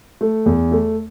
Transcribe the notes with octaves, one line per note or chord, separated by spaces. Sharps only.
A3
E2
A3